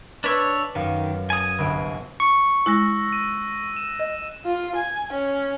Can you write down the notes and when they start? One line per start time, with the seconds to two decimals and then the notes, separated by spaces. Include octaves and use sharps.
0.24 D4 B4 C#5 E5 D6 B6
0.75 F#2 D#3 F5
1.30 G#5 D#6
1.58 G1 C2 D7
2.20 C#6
2.66 G#3 E4 E6 F#6 A#6
3.13 D#7
3.77 E7
3.99 D#5
4.45 F4
4.75 G#5
5.12 C#4